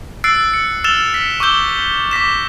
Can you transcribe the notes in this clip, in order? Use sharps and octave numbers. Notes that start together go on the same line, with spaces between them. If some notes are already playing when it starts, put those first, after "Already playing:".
E6 F#6 A6 C7 D7
C#7
E6 F6 A6 E7 F7 G7
B6 C#7
C#6 D6 E6 G6 G7
D6 A#6 B6 E7